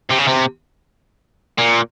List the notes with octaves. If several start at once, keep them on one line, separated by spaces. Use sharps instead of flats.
C3
C#3
C3
A#2